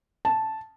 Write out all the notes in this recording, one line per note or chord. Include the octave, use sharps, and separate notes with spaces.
A5